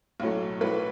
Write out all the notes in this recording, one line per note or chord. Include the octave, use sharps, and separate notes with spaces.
B1 A2 F#3 A3
B1 A2 F#3 A3 B4